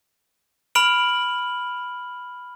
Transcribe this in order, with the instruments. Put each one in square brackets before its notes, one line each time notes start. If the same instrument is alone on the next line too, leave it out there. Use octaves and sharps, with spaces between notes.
[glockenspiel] B5 F6 D7 F#7